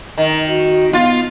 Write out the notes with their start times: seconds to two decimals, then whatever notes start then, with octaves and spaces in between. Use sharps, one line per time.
0.18 D#3
0.48 F#4
0.93 B3 F4